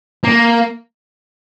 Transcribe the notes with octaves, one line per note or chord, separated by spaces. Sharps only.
A#3